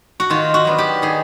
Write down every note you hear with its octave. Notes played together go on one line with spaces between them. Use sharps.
F#4
D#3 F4
F#4
F#3 B3 D4
G4
D#3 G#4